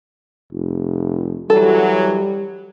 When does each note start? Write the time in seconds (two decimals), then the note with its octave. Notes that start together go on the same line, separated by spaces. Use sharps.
0.52 F1
1.50 F#2 E3 F#3 G3 A4